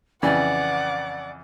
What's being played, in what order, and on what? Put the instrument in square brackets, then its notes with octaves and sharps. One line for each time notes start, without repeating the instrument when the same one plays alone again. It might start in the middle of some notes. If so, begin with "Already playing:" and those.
[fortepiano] F2 C#3 E3 [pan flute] D5 [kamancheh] F#5 D6